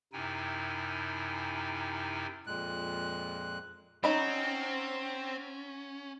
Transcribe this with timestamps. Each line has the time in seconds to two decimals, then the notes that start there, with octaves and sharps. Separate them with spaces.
0.13 F#2 C3 D#4 E4 G5 G#5
2.47 F2 A#2 G#3 F#6
4.04 F#3 C4 C#4 D#4 B5